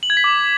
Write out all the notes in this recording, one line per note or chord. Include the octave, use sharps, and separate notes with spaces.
F#7
G#6
B6
D6